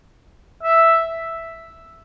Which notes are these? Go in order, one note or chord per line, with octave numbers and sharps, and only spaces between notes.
E5